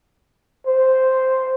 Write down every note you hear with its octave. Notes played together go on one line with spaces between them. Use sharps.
C5